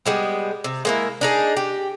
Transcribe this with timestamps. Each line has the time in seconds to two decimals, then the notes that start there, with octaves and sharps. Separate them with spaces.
0.06 G3 G#3 B3
0.64 C3
0.85 G#3 A#3 E4
1.21 D4 D#4 G#4
1.57 G4